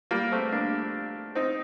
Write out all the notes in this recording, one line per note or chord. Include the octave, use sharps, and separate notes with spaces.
G3 A#3
A3 C4
A#3 D4
C4 D#4